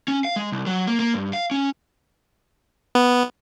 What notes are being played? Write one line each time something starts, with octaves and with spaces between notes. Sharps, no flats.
C#4
F5
G#3
C2
F#3
A#3
A#3
G2
F5
C#4
B3